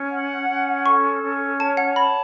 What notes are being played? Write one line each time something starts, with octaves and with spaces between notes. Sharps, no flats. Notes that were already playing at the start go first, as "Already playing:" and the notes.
Already playing: C#4
F#5
C#4
A4 C#6
C#4
C#5 A5
F#5
A5 B5